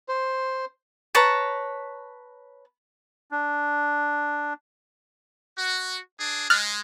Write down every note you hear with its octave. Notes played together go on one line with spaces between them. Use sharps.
C5
B4 C#5 A5 A#5
D4
F#4
D4 G#4
G#3 F6 F#6 A6